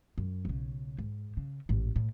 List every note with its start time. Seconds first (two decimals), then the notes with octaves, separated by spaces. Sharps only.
0.18 F#2
0.45 B1 C#3
0.99 G#2
1.37 C#3
1.69 A1 G#2
1.96 A2